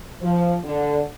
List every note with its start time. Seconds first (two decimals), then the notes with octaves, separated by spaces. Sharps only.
0.21 F3
0.64 D3